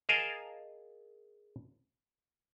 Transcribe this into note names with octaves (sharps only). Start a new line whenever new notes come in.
G#4 A#4 D#5 F5 G#5 A5